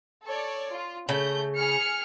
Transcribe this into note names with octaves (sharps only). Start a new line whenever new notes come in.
A4 C#5 D5
F4
C#3 A3 G6
G#4 F6 C#7